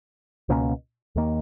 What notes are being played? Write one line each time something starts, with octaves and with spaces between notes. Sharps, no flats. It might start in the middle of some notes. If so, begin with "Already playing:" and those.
C#2 B2 A#3 C#4
D#2 D#3 A#3